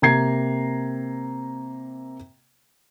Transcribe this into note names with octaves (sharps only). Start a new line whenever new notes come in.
C3 A#3 A#5 G#6 C7